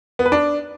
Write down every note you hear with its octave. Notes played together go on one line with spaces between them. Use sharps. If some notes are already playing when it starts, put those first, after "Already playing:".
B3
B4
D4